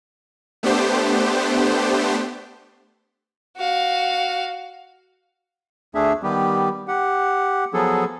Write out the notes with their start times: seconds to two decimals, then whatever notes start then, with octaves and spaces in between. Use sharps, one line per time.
0.63 A3 B3 D4 G4 C5
3.57 F#4 F5
5.95 D2 A3 D4 G#4 E5
6.23 D#3 G3 B3 G4
6.88 G4 F#5
7.74 F3 F#3 B3 G#4 A4